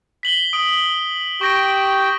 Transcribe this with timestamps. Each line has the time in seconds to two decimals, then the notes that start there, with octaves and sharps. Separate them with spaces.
0.23 B6 F#7 G7
0.53 D#6 D7
1.41 G4 G5 C#6 A#6 D7